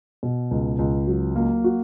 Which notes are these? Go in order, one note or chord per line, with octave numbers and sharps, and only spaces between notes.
B2
C#2
C#2
F#3
A#3
F#4